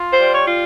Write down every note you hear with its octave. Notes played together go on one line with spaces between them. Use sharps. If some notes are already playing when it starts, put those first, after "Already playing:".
Already playing: F4
C5
G3
C#5
F4